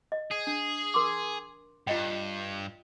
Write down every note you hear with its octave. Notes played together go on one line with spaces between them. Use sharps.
D#5
G#4
D4
A#4 C6 D6
G2 F4 D#5 G5